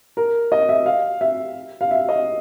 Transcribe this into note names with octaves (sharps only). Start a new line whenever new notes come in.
A#4
D#5
E5
F5
E5
F5
E5
D#5